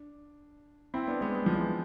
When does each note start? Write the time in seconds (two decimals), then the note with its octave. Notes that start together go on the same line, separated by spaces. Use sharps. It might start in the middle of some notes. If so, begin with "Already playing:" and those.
Already playing: D4
0.94 C4 E4
1.08 B3 D4
1.21 G#3 B3
1.35 G#3
1.46 F3
1.55 E3 G#3